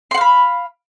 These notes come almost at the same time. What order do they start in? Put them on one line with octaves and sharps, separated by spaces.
C6 F#5 F5 B5